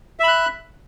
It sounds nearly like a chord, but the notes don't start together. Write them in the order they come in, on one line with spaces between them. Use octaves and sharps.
E5 B5 F#6